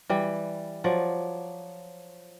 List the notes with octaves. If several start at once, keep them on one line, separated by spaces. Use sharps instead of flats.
E3 G3
F3 F#3 D5